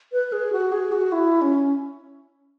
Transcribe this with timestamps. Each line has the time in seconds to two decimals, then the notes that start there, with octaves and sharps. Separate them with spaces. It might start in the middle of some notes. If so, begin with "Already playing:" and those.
0.12 B4
0.32 G#4
0.52 F#4
0.72 G#4
0.92 F#4
1.12 E4
1.42 C#4